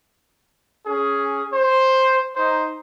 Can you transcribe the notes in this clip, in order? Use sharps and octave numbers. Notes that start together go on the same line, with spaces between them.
C#4 G#4
C5
D#4 C5